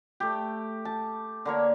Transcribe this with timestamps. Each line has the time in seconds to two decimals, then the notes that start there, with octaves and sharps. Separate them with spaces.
0.20 A3 G4
0.85 A5
1.45 D3 A#3 C#5